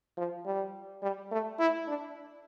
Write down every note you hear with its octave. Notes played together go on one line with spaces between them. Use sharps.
F3
G3
G3
A3
E4
D4